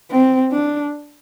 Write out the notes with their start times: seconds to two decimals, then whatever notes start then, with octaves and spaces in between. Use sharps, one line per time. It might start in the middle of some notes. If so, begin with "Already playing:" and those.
0.10 C4
0.51 D4